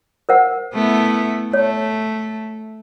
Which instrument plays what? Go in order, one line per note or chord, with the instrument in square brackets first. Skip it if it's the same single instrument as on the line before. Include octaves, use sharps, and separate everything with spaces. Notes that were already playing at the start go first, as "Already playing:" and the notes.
[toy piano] A#4 C5 F#5
[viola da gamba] A3 B3 E4
[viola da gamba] A3 [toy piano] C#5